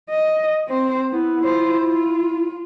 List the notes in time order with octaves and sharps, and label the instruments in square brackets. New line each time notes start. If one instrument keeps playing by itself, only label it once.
[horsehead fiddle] D#5
C4 C5
[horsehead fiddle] B3 [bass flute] E4
[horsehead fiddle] F4 C5
F4